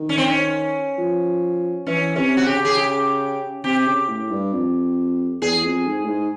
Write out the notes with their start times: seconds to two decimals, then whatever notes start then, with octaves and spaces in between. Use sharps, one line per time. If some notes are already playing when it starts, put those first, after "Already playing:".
Already playing: D#3
0.09 C#4
0.18 C4
0.27 C#4
0.98 F3
1.87 E3 C#4
2.16 C3 C#4
2.37 F#4
2.46 C#3 G4
2.65 G#4
2.75 G4
3.64 C3 G4
3.86 C#3
4.08 A2
4.31 G2
4.53 F2
5.41 E2 G#4
5.63 F2
5.87 G#2
6.04 A2
6.08 G#2